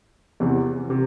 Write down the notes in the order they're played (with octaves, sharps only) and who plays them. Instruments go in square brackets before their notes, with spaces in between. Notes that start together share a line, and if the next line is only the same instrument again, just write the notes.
[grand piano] E2 C3 E3
C3